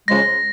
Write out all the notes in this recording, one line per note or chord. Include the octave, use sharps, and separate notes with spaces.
C#3 F3 G#3 A#6